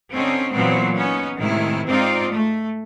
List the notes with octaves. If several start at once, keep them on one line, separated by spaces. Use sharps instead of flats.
D3 C4 C#4 D#4
A#2 E3 F#3 B3 C4
B3 C#4 D#4
A2 C3 D#3 G#3 E4
G#2 C4 D#4 F4 D5
A3